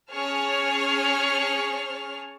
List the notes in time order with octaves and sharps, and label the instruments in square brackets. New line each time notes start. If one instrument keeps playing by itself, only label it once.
[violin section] C#4 G#4 C#5 A5 F6